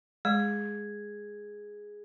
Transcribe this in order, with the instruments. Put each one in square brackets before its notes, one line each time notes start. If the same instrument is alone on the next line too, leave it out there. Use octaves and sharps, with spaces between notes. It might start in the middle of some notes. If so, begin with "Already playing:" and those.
[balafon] G#3 [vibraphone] G#4